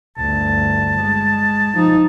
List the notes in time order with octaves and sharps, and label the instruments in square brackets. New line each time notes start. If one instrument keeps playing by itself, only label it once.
[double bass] G1 D2 [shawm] A5
[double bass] G#3
F3 D#4